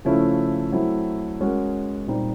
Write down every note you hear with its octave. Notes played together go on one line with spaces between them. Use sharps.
C#3 F3 A3 C#4 E4
F#3 A3 C4 E4
G#3 C#4 F#4 A#4
A#2 G3 C4 D#4